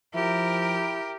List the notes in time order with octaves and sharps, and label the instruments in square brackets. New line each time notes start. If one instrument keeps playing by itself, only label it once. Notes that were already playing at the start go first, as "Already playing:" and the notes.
[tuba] F3 [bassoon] E4 [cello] G4 A#4